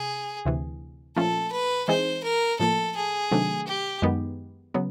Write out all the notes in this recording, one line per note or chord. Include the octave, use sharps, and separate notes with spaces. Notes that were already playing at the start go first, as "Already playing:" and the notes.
Already playing: C3 G#4
D2 C3 E3
A#2 F3 A3 C#4 F4 A4
B4
E3 G#3 C4 D#4 G#4 C5
A#4
A2 F3 A#3 A4
G#4
C3 D#3 F#3 A3 D4
G4
F#2 D#3 G#3 B3 D#4
C#3 F#3 B3